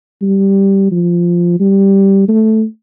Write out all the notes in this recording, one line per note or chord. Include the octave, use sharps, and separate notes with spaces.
G3
F3
G3
A3